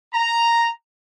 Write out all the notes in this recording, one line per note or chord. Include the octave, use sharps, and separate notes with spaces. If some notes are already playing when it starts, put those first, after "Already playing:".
A#5